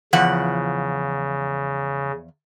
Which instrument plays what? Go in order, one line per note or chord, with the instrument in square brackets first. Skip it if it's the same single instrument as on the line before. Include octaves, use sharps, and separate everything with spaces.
[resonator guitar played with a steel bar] E2 F3 F#5 [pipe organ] C#3